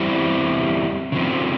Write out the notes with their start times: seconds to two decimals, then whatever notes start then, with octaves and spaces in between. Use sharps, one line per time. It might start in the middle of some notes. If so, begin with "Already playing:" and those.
Already playing: E2 E3 G3 C4 E4
1.12 C#3 F3 C4